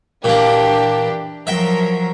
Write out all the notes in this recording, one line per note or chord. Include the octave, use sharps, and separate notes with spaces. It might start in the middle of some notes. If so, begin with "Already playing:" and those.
A#2 E3 A#3 D4 G4
F3 F#3 A#4 E5 G5